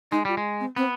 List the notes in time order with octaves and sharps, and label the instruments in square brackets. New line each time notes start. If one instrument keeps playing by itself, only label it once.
[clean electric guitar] G#3 [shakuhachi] D#4
[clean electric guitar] G3 [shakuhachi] F4
[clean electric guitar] G#3
[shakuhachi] C4
[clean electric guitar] B3 [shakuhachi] C4